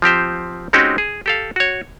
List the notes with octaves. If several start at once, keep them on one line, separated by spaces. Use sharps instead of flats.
F3 C4 G4 C5
G#3 C4 C#4 D#4 F#4 G4
G#4
G4 A4 F5
F#4 C#5